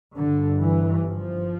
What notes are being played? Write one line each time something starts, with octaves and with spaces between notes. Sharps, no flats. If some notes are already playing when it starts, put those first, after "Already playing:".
G1 G2 D3
E3
F3